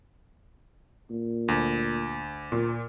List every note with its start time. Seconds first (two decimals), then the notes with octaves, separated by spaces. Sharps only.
1.11 A#2
1.48 D2
2.52 A#2